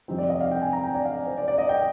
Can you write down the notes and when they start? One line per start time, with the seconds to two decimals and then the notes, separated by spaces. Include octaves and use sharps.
0.08 F2 C3 G3 C4 D#4
0.18 D5
0.30 D#5
0.41 F5
0.51 G5
0.62 G#5
0.73 A#5
0.84 G5
0.94 D5
1.05 F5
1.27 C5
1.38 D5
1.48 D5
1.58 D#5
1.69 G5